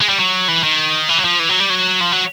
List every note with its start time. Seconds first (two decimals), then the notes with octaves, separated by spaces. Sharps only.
0.01 G#3
0.09 G3
0.18 F#3
0.48 E3
0.63 D#3
1.09 E3
1.18 F#3
1.25 F3
1.40 E3
1.49 F#3
1.60 G3
1.70 F#3
2.01 F3
2.12 F#3